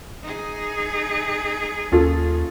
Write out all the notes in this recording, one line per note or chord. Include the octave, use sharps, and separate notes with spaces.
D#4 G#4
D#2 C#4 F4 A4